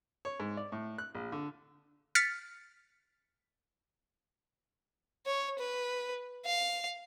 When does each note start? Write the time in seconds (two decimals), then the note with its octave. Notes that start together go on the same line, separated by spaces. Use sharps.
0.25 C#5
0.40 G#2
0.57 D5
0.72 A2
0.98 F#6
1.15 A#1
1.32 D3
2.15 F6 A6 B6 C#7
5.26 C#5
5.58 B4
6.45 F5